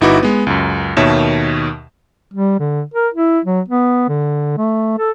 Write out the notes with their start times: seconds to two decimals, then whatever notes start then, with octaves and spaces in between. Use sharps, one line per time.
0.01 G1 D#4 E4 F#4 B4 D6
0.23 G#3 B3
0.47 C#2 F#2
0.97 D#2 B2 D#3 C#5 E5 E7
2.34 G3
2.60 D3
2.94 A#4
3.14 E4
3.45 F#3
3.69 B3
4.09 D3
4.58 A3
4.99 A4